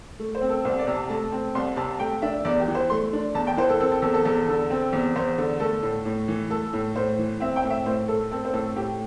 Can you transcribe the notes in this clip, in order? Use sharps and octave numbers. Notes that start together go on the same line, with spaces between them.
A3
C5
C4
A4
C2 C5
D5
C3
A5
A3 A5
C4
C2 C6
C3 A5
A3 G5
D4 E5
E2 D5
G4
E3
C5
A3 C6
D4
E2 A5
G5
E3 C5
A4
C4 A4
A4
E2 A4
A4
E2 A4
D3
C4
E2
E2 C5
D3
A3 A4
A2
A2
E3
A3 A4
A2
A2 C5
E3
C4 E5
G5
A2
E5
A2 C5
A3 A4
C4 A4
C5
A2 A4
A2 G4